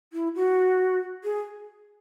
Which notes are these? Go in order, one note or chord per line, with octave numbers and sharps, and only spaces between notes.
E4
F#4
G#4